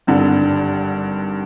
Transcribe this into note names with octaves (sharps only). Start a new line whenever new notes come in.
G#1 G2 D3